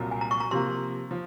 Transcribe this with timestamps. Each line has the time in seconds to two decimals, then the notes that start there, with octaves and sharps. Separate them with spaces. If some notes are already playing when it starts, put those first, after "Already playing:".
Already playing: C2 A#2 F#3
0.11 G#5
0.21 A#5
0.31 C#6
0.40 A#5
0.51 C3 F3 A#3 C6
1.11 F3